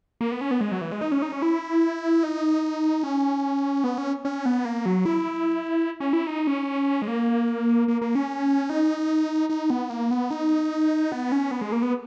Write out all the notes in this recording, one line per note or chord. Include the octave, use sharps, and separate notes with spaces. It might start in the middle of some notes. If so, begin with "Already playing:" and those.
A#3
B3
C#4
B3
G#3
F#3
E3
G#3
D#4
C#4
D#4
C#4
E4
D#4
C#4
B3
C#4
C#4
B3
A#3
F#3
E4
C#4
E4
D#4
C#4
G#3
A#3
A#3
A#3
C#4
D#4
D#4
B3
A#3
B3
D#4
B3
C#4
B3
G#3
A#3
B3